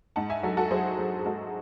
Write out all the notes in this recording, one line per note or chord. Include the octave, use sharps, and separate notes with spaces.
G#2 F#5 A5
E5 G#5
F#3 F#4 A4
F#4 A4
F#3 G#4 C5
F#3
G#4
G#2 F#4 A4